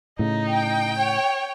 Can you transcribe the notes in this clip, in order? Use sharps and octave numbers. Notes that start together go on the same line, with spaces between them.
A2 C#3 D#4
G5
C#5